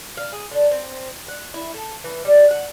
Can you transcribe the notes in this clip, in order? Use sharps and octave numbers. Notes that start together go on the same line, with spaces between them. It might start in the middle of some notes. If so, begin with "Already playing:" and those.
F5
G#4
D3
C4
F#5
E4
A4
E3
G3
F#5